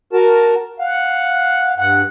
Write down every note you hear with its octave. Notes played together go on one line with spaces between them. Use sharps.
F#4 A#4 A5
F5 F#5
G2 F#5